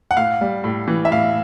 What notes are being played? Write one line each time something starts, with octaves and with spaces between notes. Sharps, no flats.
F#5
A2 F5
G3
A2
E3
E5
A2 F5